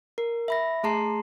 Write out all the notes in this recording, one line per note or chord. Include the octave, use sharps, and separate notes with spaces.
A#4
E5 B5 A#6
A3 G#4 A5 A#5 C6 C7